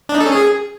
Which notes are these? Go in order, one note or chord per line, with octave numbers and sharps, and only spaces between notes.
D4
D#4
A4
C#4
G#4